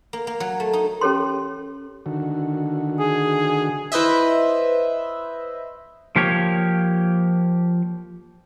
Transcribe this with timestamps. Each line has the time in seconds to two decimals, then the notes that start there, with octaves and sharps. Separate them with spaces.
0.13 A#3
0.27 A#3
0.40 F#3
0.60 A3
0.73 D#4
1.01 C#4 G4 A4 C#5 C6
2.06 D3 D#3 F#4
2.99 G#4
3.92 E4 B4 C5 D#5 E5
6.16 F3 A#3 G4 C#5